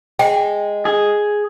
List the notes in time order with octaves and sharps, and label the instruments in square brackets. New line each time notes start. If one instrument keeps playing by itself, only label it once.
[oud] G#3 [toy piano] G5
[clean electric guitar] G#4